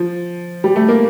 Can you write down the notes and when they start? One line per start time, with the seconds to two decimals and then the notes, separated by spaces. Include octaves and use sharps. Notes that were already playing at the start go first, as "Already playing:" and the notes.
Already playing: F3
0.64 G3
0.76 A3
0.88 A#3